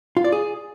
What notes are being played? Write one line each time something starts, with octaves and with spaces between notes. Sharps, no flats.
F4
D5
G#4